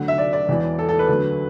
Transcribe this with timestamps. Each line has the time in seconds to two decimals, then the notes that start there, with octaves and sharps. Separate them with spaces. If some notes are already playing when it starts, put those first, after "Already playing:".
Already playing: D2 D3 F#3 F#5
0.08 E5
0.18 D5
0.33 D5
0.48 E1 E2 E3
0.79 A4
0.89 A4
0.99 B4
1.08 D2 D3 F#3